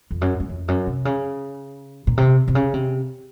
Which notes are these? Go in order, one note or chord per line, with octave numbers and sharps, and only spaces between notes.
F2
F#2
F#2
F2
F#2
C3
C#3
A#2
C3
C3
C#3
C3